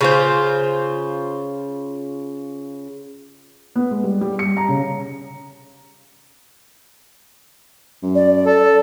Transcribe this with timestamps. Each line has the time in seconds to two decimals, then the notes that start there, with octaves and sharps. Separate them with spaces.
0.01 C#3 F4 C5
3.76 B3
3.91 G#3
4.04 G3
4.21 G3
4.39 C#7
4.57 A#5
4.68 C#3
8.02 F#2
8.15 D5
8.46 A4